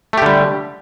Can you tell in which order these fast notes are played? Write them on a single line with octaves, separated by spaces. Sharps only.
A3 G4 D3 G3